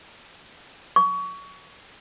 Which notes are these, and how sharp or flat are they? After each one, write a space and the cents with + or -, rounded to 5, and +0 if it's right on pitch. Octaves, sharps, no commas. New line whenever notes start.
C#6 +25